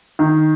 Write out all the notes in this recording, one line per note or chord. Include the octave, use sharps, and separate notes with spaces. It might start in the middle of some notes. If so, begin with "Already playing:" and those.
D#3